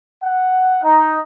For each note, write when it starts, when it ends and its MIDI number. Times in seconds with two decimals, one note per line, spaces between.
0.22 0.76 78
0.81 1.18 63